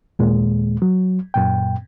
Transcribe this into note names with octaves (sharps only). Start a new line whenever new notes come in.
D#2 A#2 G#3
F#3
F#2 A#2 G5